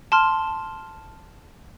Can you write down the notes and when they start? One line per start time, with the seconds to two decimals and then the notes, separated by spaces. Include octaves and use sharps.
0.12 A5 C6 F6